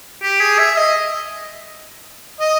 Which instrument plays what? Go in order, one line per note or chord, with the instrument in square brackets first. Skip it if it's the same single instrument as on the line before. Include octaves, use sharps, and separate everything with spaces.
[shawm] G4
G#4
E5
D#5
D#5